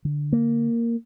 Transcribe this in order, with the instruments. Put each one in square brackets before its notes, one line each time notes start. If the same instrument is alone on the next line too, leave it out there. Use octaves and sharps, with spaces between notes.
[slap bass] D3
A#3